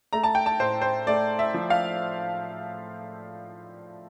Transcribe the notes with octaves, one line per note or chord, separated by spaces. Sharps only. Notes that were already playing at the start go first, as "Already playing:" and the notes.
A3 A#5
A5
G5
A5
A2 C5
C5
A3 D5
E5
F3
F5